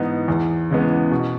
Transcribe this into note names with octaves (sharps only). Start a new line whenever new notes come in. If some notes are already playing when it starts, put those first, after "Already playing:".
Already playing: G#2 E3 B3 D#4
E2
C#3 E3 G#3 B3
B2